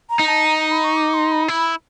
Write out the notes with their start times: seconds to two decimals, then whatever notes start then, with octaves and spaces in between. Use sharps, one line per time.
0.10 A#5
0.19 D#4
0.28 A5
0.45 A#5
0.58 A#5
0.72 B5
0.84 C#6
0.96 D6
1.14 C6
1.32 B5
1.48 E4 B5